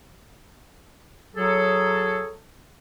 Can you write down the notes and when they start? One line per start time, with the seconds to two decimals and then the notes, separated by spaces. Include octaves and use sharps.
1.36 F#3 G#4 A4